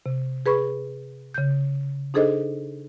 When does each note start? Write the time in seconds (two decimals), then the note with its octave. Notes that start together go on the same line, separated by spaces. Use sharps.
0.06 C3
0.46 G#4 B4 B5 C#6
1.34 C#3 G6
2.14 D4 D#4 G#4 A4 C5 D#5